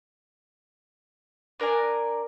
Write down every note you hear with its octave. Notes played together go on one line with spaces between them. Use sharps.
D4 A#4 D5 G#5